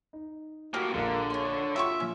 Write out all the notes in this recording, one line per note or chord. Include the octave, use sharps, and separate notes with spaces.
D#4
A2 A#3 F#4 G4 D#5 F5
A#1 D3 G#3 A#3
C#3 C#5 C6
F#3 F4 G4 E5 C6 C#6
A#2 F3 C#4